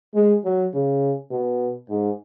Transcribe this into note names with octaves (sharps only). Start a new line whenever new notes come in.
G#3
F#3
C#3
B2
G#2